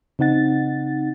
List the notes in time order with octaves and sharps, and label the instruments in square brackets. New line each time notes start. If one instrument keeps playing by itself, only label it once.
[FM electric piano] C#3 C4 D#4 F#5 A6